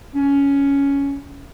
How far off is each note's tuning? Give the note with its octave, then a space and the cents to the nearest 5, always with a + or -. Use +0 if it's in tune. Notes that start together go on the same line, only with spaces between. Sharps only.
C#4 +10